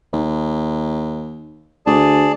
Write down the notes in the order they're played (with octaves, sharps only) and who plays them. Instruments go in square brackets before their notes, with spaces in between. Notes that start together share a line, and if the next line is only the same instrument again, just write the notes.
[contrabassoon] D#2
[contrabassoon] D2 [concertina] G#4 D5 A5